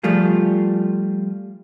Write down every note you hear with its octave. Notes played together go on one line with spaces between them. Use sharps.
F3 G3 A3 F4 G#4